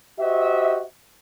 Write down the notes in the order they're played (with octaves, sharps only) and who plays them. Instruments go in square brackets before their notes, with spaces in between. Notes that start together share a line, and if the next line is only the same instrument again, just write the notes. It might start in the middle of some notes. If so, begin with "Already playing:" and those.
[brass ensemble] F#4 G4 C5 D#5 E5